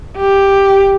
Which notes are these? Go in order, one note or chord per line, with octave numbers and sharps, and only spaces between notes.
G4